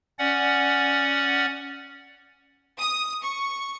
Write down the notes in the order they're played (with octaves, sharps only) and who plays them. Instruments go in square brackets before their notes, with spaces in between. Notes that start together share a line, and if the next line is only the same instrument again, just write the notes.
[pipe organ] C#4 D5 F#5
[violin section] D#6
C#6